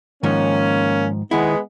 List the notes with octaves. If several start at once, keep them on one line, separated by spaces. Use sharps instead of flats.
G#2 D#3 F3 A#3 C#4
D#2 G#3 B3 E4